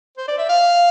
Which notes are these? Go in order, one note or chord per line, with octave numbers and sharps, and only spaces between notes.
C5
D5
E5
F5